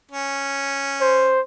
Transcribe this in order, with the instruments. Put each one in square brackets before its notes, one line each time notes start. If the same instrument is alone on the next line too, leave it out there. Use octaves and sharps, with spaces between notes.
[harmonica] C#4
[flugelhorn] C5